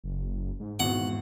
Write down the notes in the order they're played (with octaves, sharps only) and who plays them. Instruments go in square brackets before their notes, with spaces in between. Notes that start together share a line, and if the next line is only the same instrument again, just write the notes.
[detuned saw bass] F#1
G#2
[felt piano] G#1 E2 F#4 [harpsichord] F#5